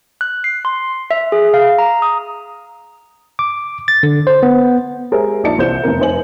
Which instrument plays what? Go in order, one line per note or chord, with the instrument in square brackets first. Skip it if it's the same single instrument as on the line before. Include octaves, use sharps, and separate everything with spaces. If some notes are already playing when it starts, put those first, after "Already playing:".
[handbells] F#6
C7
C6
E5
G#4
F5
A#5
D#6
[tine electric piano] D6
A6
D3
C5
B3
[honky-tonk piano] G#3 G4 G#4 A#4 C5 E5
A#1 D#4 D5 D#5 A5 C#7
C2 E3 C5 E5 G6 E7
F1 E2 C3 A#4
F1 D#4 C5 G#5 F#7